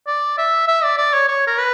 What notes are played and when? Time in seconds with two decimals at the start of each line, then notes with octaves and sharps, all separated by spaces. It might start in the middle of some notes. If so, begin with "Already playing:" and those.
0.07 D5
0.38 E5
0.68 E5
0.83 D5
0.97 D5
1.13 C#5
1.28 C#5
1.47 A#4
1.58 B4